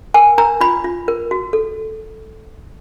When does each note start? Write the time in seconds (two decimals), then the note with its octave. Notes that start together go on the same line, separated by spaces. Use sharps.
0.14 A#4 G#5
0.38 A#4 A#5
0.61 F4 B5
0.84 F4
1.08 A#4
1.31 F#4
1.53 A4